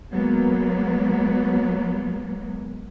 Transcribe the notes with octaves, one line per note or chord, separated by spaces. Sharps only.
F#3 G#3 A#3 B3